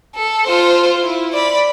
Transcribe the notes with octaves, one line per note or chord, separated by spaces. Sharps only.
A4
F4 C5
E4
D5 B5